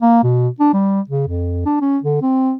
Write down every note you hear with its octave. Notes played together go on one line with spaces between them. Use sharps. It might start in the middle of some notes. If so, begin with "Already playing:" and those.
A#3
B2
D4
G3
C#3
F2
D4
C#4
D3
C4